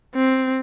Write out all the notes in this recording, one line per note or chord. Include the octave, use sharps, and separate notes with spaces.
C4